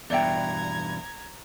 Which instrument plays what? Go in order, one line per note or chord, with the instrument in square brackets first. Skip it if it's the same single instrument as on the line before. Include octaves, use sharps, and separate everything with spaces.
[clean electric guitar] E2 G2 B2 [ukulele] D5 E5 G5 [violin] A#5 G#6